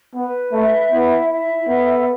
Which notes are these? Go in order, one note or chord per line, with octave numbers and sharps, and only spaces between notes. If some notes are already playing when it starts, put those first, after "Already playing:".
B3 B4
A3 E5
B3 E4
E5
B3 A4